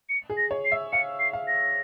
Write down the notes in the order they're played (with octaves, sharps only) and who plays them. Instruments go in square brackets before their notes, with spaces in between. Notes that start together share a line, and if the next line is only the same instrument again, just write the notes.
[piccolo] C#7
[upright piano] G#4
[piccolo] A#6
[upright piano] C#5
[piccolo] C7
[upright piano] E5
[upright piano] F5 [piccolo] C#7
[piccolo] C7
[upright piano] F5
[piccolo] A#6